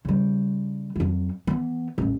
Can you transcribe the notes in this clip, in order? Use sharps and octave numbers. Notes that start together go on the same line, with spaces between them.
C#3 G3
F2 F#3
E3 B3
D#1 A1